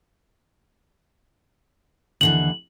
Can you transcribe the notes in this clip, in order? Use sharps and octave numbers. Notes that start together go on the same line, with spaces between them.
D#2 D3 E3 F#7